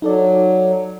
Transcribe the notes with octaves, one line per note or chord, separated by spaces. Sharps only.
F#3 D#4 A4 D5